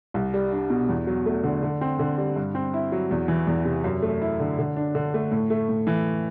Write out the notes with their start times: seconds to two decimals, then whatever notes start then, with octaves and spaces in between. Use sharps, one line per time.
0.14 C2
0.34 G3
0.52 D4
0.70 B2
0.89 E2
1.07 F#3
1.26 A3
1.43 D3
1.63 D3
1.81 C4
1.99 D3
2.18 G3
2.36 G2
2.55 C4
2.74 E4
2.92 F#3
3.11 E2
3.28 E3
3.47 E2
3.65 C3
3.84 F#2
4.02 A3
4.22 E4
4.40 D3
4.59 D3
4.77 D4
4.95 D3
5.14 A3
5.32 A2
5.50 A3
5.69 A2
5.87 E3